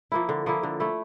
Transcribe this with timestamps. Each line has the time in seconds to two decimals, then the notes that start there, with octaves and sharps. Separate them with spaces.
0.12 F3 A#3 E4
0.29 D3
0.46 F3 A#3 E4
0.63 D3
0.80 A3 E4